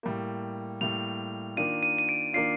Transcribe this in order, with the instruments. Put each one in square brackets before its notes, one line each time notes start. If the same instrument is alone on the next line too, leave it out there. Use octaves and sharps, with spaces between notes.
[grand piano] A2 G3 A#3
[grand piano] A2 G3 A#3 [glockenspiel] F7
[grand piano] D#3 A#3 D4 F4 [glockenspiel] D#7
[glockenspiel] D#7
D#7
D7
[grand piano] D#3 A#3 D4 F4 [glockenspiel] C7